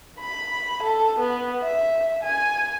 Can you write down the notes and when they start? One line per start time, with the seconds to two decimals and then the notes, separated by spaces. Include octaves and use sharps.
0.19 B5
0.83 A4
1.19 B3
1.62 E5
2.23 G#5